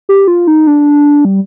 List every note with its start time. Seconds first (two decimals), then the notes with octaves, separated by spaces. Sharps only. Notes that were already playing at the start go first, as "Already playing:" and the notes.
0.09 G4
0.28 F4
0.47 D#4
0.67 D4
1.25 G3